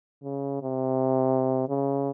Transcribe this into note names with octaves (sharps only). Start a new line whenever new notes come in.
C#3
C3
C#3